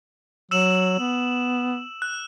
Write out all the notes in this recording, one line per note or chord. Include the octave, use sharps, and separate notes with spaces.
F#3 E6 E7 F#7
B3
F#6